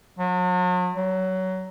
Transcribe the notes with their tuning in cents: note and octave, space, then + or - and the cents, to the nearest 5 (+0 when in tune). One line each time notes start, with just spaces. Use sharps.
F#3 -40
F#3 +20